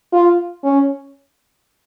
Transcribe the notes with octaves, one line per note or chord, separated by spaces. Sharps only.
F4
C#4